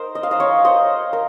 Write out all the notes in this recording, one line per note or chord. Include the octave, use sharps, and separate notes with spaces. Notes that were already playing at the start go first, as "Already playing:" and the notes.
Already playing: D#4 A#4 C5
D#5
F5
C5 D#5
C#5 F5
C5 D#5
A#4